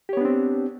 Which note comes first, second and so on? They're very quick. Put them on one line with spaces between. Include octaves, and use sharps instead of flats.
G4 C#5 B3 D4 C4